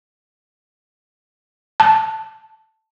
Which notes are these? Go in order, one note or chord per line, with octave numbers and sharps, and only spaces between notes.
A5